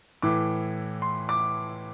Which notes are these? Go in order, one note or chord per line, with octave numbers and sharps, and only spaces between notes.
A2 E3 D6
C6
D6